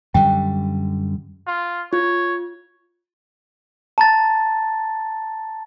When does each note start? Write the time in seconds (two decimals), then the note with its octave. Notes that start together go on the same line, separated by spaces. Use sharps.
0.14 F#2 D3 G3 G5
1.47 F4
1.93 F4 C#5
3.98 A5 A#5 A6